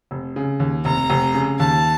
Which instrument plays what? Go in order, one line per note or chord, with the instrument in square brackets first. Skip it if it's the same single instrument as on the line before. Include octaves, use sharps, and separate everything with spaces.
[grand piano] F1
C#3
D#2
[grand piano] F1 [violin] A#5
[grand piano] F1
C#3
[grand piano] D#2 [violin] A5